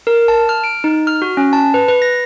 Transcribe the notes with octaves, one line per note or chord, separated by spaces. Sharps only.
A#4
A5
F6
D7
D#4
F6
F#4
C#4
A5
B4
B4
A#6